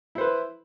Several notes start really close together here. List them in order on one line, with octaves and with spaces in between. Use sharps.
E4 C5 B4